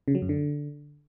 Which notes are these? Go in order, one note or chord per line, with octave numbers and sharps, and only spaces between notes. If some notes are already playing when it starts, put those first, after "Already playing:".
C#3
F#3
F#2
D3